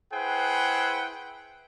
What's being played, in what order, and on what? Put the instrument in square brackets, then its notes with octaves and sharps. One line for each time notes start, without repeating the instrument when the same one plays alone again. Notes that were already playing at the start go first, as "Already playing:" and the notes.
[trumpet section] E4 G#4 B4 C5 F#5 G5